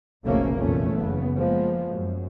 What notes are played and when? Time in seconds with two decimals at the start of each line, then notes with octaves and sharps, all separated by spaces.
0.24 F1 B1 C#3 A3 A#3 C#4
0.56 F1 E2 A#2 A3 C#4
0.94 F#1 C#3 B3
1.36 F3 G#3 A#3 B3
1.89 F#2